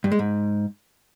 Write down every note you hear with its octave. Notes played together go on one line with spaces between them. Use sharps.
G2
G#3
G#2